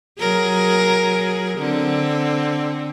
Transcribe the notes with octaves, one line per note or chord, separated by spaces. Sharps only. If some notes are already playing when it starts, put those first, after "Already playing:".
F#3 G#4 A#4
D3 C4